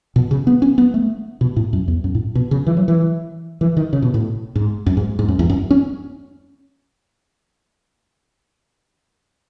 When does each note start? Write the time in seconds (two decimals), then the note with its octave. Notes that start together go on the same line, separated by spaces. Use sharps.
0.16 B2
0.31 C#3
0.47 B3
0.62 C#4
0.78 B3
0.94 A3
1.41 B2
1.56 A2
1.73 F#2
1.88 E2
2.04 F#2
2.15 A2
2.35 B2
2.51 C#3
2.67 E3
2.77 F#3
2.88 E3
3.61 E3
3.77 D#3
3.93 C#3
4.02 B2
4.14 A2
4.55 G#2
4.86 F#2
4.97 G#2
5.19 G#2
5.28 F#2
5.39 E2
5.50 F#2
5.71 C#4